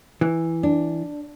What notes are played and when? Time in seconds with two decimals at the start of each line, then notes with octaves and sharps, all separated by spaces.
0.21 E3
0.63 D4